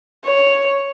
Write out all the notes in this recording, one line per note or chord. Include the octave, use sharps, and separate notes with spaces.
C#5